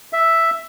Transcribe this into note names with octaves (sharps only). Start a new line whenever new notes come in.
E5